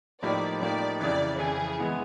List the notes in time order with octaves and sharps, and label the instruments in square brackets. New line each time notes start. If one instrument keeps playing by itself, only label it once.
[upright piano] A2 F3 A#3 D#4 G4 [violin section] D5
[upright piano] A2 F3 A#3 D#4 G4 [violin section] D5
[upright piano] F2 C#3 E3 [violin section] D5
[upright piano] F2 C#3 E3 [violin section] G#4
[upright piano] E3 G#3 B3 E4